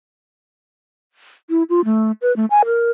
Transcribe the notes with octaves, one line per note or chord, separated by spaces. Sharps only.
E4
F4
A3
B4
A3
G#5
A#4